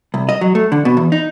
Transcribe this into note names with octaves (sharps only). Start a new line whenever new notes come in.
C2
D#5
F#3
A3
D3
B2
E2
D#4